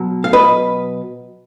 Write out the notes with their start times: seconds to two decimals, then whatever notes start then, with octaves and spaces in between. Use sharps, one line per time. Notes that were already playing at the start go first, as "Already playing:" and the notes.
Already playing: B2 F#3
0.24 F5
0.33 B4 D#5